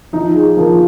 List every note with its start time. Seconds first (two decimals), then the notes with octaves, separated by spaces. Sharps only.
0.13 F3 D#4
0.35 G#4
0.57 F3 A#4